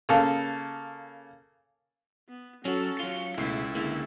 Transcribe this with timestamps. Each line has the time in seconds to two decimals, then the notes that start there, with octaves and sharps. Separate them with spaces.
0.09 C#3 A#3 A4
2.29 B3
2.65 F#3 C#4 F#4 A4
3.00 F#3 F4 C#7
3.38 C#2 B2 A3 E4 C7
3.75 D3 G#3 A#3 E4 A4